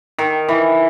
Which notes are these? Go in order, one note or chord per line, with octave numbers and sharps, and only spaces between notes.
D#3
E3